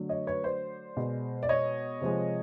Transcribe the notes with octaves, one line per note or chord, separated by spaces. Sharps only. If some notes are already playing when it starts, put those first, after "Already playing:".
Already playing: D3 F#3 A3
C#5 D#5
B4 C#5
C5 D5
B2 G#3
D5
C#5 D#5
C3 F3 G#3